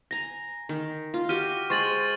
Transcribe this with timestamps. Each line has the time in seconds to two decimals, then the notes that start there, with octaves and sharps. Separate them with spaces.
0.11 G#5 A#5 A#6
0.69 D#3
1.14 F4
1.29 F#4 G4 F6 D#7
1.70 G#3 C5 C#6 A6 F#7